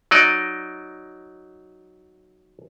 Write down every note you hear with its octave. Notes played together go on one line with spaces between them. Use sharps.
F#3 D#4 D5 D#5